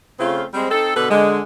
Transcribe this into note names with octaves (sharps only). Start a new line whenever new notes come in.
C#3 A3 C4 F4
G3 G#3 C4
C4 D#4 A4
B2 D3 B3 A4 B4
D3 G#3